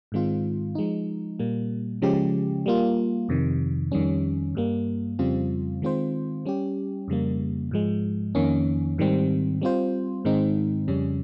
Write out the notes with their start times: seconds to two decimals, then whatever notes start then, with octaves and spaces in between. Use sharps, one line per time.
0.12 G#2 D#3 G#3 C4 F4
0.75 F3 G#3 D#4
1.39 A#2 G3 A#3
2.02 C#3 F3 G#3 C#4 G4
2.66 G3 A#3 F4
3.29 F2 C3 D#3
3.92 F2 D#3 G3 C#4
4.55 G2 G3 A#3
5.19 F2 C#3 G3 C4 F4
5.82 D#3 G#3 C4 F4 C5
6.45 G3 C#4 G4
7.08 F2 C#3 G3 A#3
7.71 G#2 F3 G#3
8.35 F2 D#3 A#3 C#4
8.98 G#2 D#3 G3 C4
9.61 G3 C4 F4 C5
10.25 G#2 D#3 G#3 C4 D#4
10.88 F2 C#3 G3 C#4